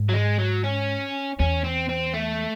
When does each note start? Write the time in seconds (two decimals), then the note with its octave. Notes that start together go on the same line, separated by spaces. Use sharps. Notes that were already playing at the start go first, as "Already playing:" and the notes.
Already playing: G#2
0.09 F#3
0.14 G#3
0.39 F#3
0.64 C#4
1.39 E2 C#4
1.64 C4
1.89 C4
2.14 A3